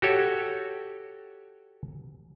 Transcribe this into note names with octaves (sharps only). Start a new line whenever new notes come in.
F#4 G4 A4 C#5